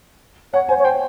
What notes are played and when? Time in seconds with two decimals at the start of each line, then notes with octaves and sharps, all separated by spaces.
0.53 C#5 F#5
0.69 C5 G#5
0.79 C#5
0.84 C5 G5